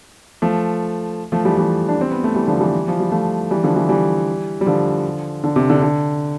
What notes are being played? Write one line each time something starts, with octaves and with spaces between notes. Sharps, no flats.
F3 A3
F3 A3
E3 G3
E3 G3
D4
C4
B3
A3
E3 G3
D3 F3
E3 G3
F3
G3
F3 A3
E3 G3
D3 F3
E3 G3
E3 G3
G3
D3 F3
D3
C3
D3
D3